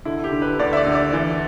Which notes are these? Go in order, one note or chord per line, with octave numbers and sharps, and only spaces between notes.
D3 E4
G4
D3
B4
D2 D5
E5
D5
D2
D5
E3